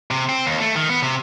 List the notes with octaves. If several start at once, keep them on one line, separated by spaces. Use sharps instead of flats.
C3
C4
D#2
A3
D#3
B3
C3